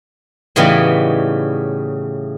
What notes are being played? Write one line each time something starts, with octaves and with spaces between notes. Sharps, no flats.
A2 C#3 E3 G3 B3 D#4